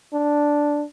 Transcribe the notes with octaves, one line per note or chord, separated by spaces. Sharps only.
D4